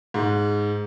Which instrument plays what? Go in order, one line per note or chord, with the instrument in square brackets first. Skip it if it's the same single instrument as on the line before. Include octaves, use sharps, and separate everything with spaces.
[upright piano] G#2